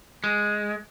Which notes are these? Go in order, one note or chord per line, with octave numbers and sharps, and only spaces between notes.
G#3